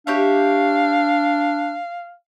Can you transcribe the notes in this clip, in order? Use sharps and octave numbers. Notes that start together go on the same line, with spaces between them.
D4 G4 C#5 E5 F5